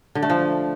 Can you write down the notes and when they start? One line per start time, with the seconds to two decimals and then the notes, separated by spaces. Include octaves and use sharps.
0.15 D3
0.23 A3
0.30 F3